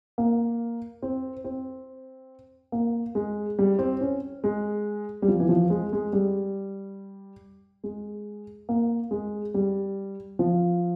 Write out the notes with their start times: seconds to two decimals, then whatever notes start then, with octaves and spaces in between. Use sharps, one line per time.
0.18 A#3
1.02 C4
1.44 C4
2.72 A#3
3.15 G#3
3.59 G3
3.79 C4
4.01 C#4
4.44 G#3
5.22 G3
5.28 F3
5.40 E3
5.49 F3
5.70 G#3
5.93 G#3
6.13 G3
7.84 G#3
8.69 A#3
9.11 G#3
9.54 G3
10.39 F3